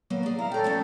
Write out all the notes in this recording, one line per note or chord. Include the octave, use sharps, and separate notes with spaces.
F#3 A#3 B3
G#4 D5
E4 F5 A#5
A4 C#5 D5 G5 A#5
F3 A3 C#4